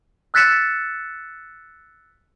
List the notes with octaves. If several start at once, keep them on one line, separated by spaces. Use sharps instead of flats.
E6 F#6 A6 B6 C#7 E7